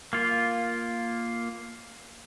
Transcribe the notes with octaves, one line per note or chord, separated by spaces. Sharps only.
A#3 F4